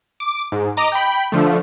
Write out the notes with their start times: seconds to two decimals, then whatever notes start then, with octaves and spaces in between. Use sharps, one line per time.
0.20 D6
0.52 G#2
0.77 D#5 A#5 D6
0.92 G5 B5
1.32 D3 F3 A3